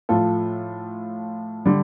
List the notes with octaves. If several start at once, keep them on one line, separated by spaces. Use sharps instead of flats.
A2 F3 F4 A4
D3 G3